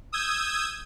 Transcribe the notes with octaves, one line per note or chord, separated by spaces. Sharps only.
D#6 E6 G6 G#6